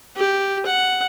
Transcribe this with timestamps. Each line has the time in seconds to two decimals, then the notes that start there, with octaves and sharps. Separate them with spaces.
0.16 G4
0.66 F#5